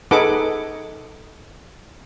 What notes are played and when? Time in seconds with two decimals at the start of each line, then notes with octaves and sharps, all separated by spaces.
0.11 D#4 G#4 A4 B4 F#5 D6